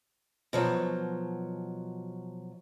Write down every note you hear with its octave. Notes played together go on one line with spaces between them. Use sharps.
B2 F3 F#3